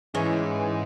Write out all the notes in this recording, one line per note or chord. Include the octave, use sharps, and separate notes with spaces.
G#2 E3 C#4 D#4 G#4